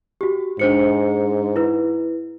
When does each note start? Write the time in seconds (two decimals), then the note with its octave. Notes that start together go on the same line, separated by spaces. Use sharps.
0.21 F#4 G4
0.59 G#2 D4 C5 C#7
1.56 E4 B4